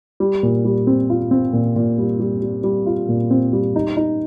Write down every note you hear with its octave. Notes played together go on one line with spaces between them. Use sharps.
G3
A#2
G3
C4
F4
C4
A#2
A#2
G3
G3
G3
G3
F4
A#2
C4
G3
D#4
D#4